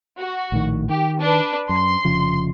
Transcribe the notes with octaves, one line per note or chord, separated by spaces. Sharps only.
F#4
A#1 A2 D#3
D#3 G4
D4 B4
F#2 C6
F1 C#3 F3